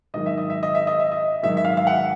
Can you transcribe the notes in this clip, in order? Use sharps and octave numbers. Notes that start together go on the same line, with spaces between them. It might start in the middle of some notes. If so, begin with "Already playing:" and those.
G#2 D#3 F#3 D#5
E5
D#5
E5
D#5
E5
D#5
E5
D#5
G#2 D#3 F#3 E5
E5
F5
F5
F#5